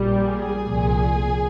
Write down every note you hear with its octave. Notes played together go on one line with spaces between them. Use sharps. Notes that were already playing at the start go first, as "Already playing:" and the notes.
Already playing: A#1 A#2 G3
G#4
C2 A#2 F3